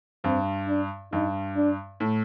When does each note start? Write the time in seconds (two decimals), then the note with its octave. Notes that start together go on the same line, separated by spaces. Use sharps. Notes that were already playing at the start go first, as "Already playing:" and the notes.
0.24 G2 C4
0.68 D4
1.12 G2 D#4
1.56 D4
2.00 A2